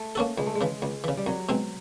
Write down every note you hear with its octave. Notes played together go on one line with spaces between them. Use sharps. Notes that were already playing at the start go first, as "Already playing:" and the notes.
Already playing: A3
A#3 C#4 F#4 A4
C#2 G#3
A3
G#3
C#3 E3
C#2
C#3 E3
G3
C2 F#3
B2 G#3 C4